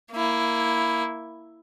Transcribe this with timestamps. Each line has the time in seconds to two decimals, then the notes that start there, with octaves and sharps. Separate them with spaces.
0.12 A#3 E4